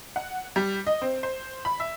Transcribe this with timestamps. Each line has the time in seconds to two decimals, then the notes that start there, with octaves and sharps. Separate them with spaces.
0.16 F#5
0.56 G3
0.87 D#5
1.02 C4
1.23 C5
1.65 B5
1.80 E5